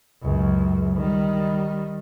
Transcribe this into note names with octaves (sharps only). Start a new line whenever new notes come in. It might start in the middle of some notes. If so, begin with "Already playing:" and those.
C#2 F#2
D#3 G3